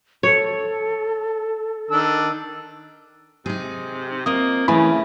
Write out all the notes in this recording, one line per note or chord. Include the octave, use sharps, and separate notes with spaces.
A4 C#5
D#3 D4 E6
C3 D#4 G#4
A#3 C4 F4 D#5 D#6
C#3 E3 A3 G#5 B5